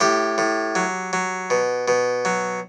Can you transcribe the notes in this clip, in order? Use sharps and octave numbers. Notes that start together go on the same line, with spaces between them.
A2 G4
A2
F#3
F#3
B2
B2
F#3